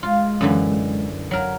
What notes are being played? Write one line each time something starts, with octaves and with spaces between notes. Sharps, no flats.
G#3 F4
F#2 D3 E3
F#3 A#4